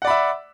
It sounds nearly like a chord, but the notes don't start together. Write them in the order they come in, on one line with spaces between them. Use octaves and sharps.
F#5 D5 B5 E5